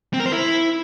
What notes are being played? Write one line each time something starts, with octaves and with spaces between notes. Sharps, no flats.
C4
A#4
C5
E4